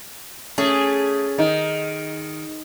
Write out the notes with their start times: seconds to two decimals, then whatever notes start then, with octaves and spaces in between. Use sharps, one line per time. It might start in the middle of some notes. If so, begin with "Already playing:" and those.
0.58 A3 C#4 G#4
1.38 D#3 D#4